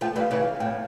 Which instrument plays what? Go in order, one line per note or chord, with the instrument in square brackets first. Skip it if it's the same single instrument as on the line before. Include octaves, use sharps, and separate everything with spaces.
[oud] F3 A3 [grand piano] G5
[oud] E3 G3
[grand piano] F5
[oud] C#3 E3
[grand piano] F5
[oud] A2 [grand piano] G5